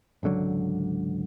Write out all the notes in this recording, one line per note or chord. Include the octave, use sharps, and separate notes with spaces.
G#1 C#2 D3 F#3